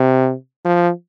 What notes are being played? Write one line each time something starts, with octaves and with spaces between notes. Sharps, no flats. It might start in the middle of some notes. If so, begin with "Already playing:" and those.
Already playing: C3
F3